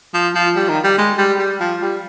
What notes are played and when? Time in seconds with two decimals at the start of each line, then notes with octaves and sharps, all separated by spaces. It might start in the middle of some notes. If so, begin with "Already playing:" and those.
0.14 F3
0.35 F3
0.56 G3
0.69 D#3
0.84 G3
0.98 G#3
1.18 G3
1.39 G3
1.60 F3
1.82 G3